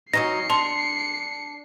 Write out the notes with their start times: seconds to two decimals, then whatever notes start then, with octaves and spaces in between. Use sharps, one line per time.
0.13 F#3 C#4 D#4 A#6 C7 C#7
0.50 D4 A5 C6